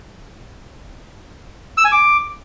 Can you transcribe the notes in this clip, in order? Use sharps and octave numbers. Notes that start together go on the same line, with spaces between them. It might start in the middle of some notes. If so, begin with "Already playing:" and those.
E6
G#5
D6